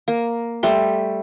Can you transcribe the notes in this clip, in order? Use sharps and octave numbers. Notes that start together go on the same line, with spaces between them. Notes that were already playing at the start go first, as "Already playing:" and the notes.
A#3
G3 A3 C6